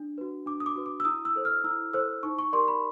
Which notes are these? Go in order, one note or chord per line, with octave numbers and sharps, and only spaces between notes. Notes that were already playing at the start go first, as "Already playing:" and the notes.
Already playing: D4
F#4 B4
D4 D6
D#6
D6
F#4 B4
D6
E6
E4 D#6
E6
A4 C5
F6
E4 E6
A4 C5 E6
D#4 C#6
C#6
G4 A#4 D5 C6
B5